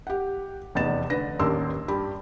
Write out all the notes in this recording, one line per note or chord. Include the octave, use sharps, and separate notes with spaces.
G4 F#5
F1 E2 B3 D#4 A6 E7
D3 B4 A#6
A1 D#2 D4 A#4 C6 E6
G2 G4 B5